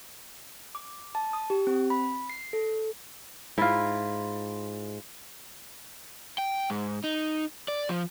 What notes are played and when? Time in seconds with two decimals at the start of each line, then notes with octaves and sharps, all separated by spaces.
0.75 D6
1.15 A5
1.33 D#6
1.50 G4
1.67 C4
1.90 B5
2.30 C7
2.53 A4
3.58 G#2 E4 F4
6.38 G5
6.70 G#2
7.04 D#4
7.68 D5
7.89 F3